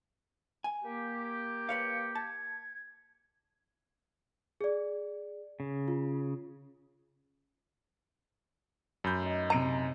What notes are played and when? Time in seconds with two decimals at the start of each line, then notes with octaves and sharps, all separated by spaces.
0.64 G#5
0.84 A#3 G4
1.69 B4 C#5 F5 C#7
2.15 A5 G#6
4.61 G#4 D5
5.60 C#3
5.88 F4
9.04 F#2 B5 G6
9.19 A3 D#4
9.50 C3 A#5 B5 D7 D#7